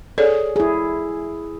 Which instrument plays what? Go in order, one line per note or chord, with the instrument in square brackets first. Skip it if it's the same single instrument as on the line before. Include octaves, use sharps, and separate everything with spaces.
[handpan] G#4 [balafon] A4 C#5 D5
[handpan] E4 G#4